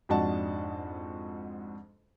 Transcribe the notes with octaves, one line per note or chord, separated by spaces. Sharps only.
F2 G#2 D4 F#4 D#5 A5